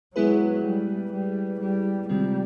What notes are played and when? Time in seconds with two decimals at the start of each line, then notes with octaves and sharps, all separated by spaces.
0.15 F#3 G#3 B3 E4 G#4 B4
0.64 G3
1.12 G3
1.60 G3
2.08 C3 D#3 G3 G#3 C4 F4